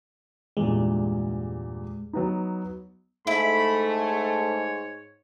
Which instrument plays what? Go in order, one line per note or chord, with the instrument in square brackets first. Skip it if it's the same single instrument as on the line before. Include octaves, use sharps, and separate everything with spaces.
[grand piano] E2 G2 A#2 [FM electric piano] G#3
[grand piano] F#3 B3 D#4
[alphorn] G#2 [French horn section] A3 [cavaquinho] E4 [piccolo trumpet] B5
[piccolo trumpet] C#5